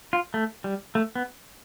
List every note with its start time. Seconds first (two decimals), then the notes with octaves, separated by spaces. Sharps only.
0.13 F4
0.34 A3
0.64 G3
0.95 A3
1.15 B3